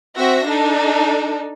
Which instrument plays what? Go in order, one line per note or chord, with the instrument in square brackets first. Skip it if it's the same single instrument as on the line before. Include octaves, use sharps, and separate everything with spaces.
[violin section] C4 F#4 E5 A#6
D4 D#4 A4